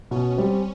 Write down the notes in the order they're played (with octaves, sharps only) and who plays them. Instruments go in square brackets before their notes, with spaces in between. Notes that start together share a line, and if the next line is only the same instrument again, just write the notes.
[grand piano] B2 [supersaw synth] C#4
[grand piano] G3 C4